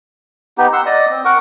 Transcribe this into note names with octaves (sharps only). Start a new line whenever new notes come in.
B3 D#4 G4
F#5 C6 E6
D5 D#5 D#6
C4
A#4 F#5 C#6